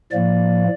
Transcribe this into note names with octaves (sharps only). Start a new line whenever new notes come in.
A2 F3 A#3 D5